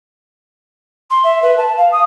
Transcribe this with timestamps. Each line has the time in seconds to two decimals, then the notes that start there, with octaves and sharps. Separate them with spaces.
1.10 C6
1.23 E5
1.42 B4
1.57 A5
1.77 F5
1.92 D#6